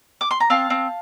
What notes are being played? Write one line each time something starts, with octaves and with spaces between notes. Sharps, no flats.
D6
C6
A#5
C4 F5 A5
C4